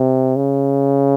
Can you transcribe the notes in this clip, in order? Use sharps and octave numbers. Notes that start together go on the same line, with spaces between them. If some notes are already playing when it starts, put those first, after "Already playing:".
Already playing: C3
C#3